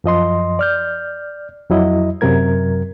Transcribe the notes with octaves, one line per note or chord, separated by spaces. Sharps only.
F#2 F3 D#5 C6
D5 F6 G6
F2 F#3 E4 D#5
F#2 C3 F#3 A#4 G#6